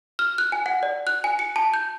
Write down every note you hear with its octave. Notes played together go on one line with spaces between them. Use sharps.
F6
F#6
G#5
F#5
D5
F#6
G#5
C#7
A5
G6